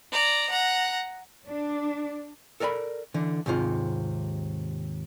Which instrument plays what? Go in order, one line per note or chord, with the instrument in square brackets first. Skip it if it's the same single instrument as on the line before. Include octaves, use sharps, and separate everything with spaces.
[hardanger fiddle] D5 A#5
F#5 A#5
[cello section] D4
[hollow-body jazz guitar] A4 A#4 D5 G#5 B5
D3 E3
D#2 G#2 C3 F4